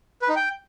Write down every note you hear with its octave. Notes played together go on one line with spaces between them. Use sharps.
B4
D#4
G5